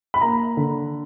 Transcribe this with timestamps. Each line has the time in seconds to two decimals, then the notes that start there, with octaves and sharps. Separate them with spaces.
0.14 B5
0.21 A#3 A#5
0.57 D3